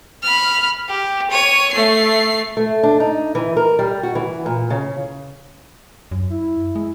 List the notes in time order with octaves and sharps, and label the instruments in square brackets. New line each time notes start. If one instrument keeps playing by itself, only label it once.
[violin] B5 F6
G4
C#5 D#7
A3 C7
[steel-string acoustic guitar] A3
D4
D#4
E3
A#4
G3
F#4
E3
A#2
C#3
[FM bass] F#2
[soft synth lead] E4
[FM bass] G#3